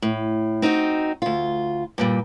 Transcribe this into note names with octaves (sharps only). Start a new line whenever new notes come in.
A2
C4 D#4 F4 F#4
D2 F4
G2 A#2 G3